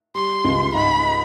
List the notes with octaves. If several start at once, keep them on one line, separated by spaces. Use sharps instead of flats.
G3 C6
C#2
G#2 B5